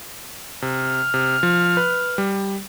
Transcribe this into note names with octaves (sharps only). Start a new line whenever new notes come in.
C3 F6
C3
F3
B4
G3